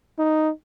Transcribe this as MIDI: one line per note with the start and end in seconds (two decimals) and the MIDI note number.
0.19 0.50 63